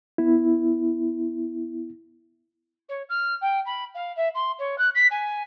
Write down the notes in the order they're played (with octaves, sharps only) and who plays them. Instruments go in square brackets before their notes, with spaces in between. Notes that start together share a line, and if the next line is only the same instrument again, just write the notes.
[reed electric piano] B3 E4
[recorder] C#5
F6
G5
B5
F5
E5
C6
C#5
F#6
B6
G#5